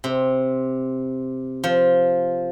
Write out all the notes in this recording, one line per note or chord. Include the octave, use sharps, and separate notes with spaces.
C3
F3